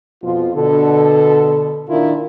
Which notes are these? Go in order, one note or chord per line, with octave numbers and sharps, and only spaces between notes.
F2 B2 F3 F4
B2 D3 A4
A#2 D#3 D4 E4 F4 A#4